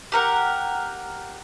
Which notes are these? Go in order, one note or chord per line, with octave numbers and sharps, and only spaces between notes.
G4 A#4 F#5